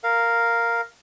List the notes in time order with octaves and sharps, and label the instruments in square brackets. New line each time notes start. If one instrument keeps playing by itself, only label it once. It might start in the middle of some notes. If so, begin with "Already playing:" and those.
[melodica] A#4 F5